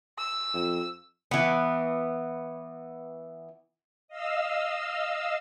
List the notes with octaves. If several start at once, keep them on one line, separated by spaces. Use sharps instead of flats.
E6
F2
E3 B3
D#5 F5 E6